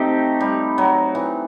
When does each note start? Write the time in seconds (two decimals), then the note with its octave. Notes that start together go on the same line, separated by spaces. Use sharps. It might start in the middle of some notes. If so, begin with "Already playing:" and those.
Already playing: A3 C4 D#4 G4
0.41 G3
0.78 F#3
1.15 E3